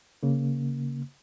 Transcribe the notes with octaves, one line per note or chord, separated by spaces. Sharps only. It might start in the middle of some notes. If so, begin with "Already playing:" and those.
C#3 A#3